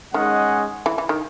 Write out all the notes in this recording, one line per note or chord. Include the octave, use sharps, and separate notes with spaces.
D#3 G#3 C#4 G#4 D#5 F#5
E3
E3
D#3